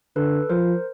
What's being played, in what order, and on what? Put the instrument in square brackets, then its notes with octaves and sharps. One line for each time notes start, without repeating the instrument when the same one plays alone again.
[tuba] D3 [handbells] A4 B4
[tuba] F3 [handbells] A#4 C5